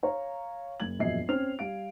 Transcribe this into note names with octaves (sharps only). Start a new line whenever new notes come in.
C#5 F5 A#5
F#1 G#6 F#7
E1 A#1 F#2 D#5 E5 C7
C4 C#4 C5 F6 F7
G3 F5 D7